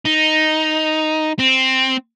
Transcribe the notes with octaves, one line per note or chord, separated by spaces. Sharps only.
D#4
C4